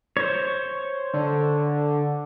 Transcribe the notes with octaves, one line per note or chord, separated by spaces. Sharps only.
C5 C#5
D3